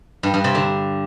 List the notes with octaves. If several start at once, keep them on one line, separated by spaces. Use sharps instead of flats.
G2
G2
C3
D3